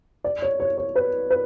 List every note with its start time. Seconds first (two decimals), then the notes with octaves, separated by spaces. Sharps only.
0.24 D5
0.42 C#5
0.60 C#5
0.78 C#5
0.96 B4
1.30 B4